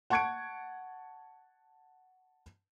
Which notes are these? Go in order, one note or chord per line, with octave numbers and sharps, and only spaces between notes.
F#5 A5 C#6 G#6 C#7 D7